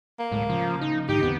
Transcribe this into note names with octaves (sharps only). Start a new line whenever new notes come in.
A#3
D1 A2 G#3
C#3 F3
D#4
G#2 D3 D#4 G4
E2 D3 B3 C4